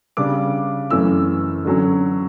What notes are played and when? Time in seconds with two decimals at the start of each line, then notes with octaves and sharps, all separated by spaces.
0.17 C#3 G3 D4 D6
0.90 F#2 E3 A3 C#4 E6
1.65 D3 F#3 C#4